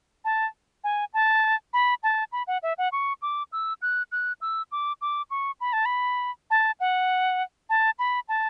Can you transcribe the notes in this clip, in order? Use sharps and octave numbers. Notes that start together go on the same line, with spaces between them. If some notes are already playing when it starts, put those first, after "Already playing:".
A5
G#5
A5
B5
A5
B5
F#5
E5
F#5
C#6
D6
E6
F#6
F#6
E6
D6
D6
C#6
B5
A5
B5
A5
F#5
A5
B5
A5